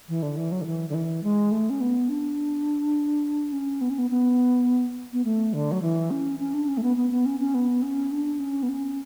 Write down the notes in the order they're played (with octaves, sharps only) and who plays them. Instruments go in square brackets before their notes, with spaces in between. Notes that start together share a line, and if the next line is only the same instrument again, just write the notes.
[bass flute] E3
D3
E3
F#3
D3
E3
D3
E3
G#3
A3
C#4
B3
D4
C#4
B3
C#4
B3
B3
B3
A3
D3
F#3
E3
C#4
C#4
D4
C#4
A3
B3
B3
B3
C#4
C#4
B3
C#4
D4
C#4
B3
C#4